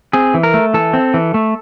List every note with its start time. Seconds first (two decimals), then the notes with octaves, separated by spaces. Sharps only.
0.13 C4 G#4
0.34 E3
0.43 A#4
0.54 A3
0.74 E3 A4
0.93 C4
1.14 E3
1.34 A3